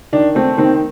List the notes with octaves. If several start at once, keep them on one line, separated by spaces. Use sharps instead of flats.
D#3 D4
A3 C4
D#3 C4